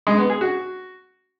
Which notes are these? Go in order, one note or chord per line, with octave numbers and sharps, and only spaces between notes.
G#3
B3
G#4
F#4